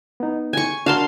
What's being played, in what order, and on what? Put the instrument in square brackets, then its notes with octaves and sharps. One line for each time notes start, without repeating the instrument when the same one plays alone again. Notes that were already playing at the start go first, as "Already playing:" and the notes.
[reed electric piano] B3 D#4
[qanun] G#5 C#6
[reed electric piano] D4 F#4 A#4 [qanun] F5 A5 C6